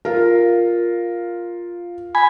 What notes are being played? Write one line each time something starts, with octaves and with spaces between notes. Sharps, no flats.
F4 A#4
G#5 B5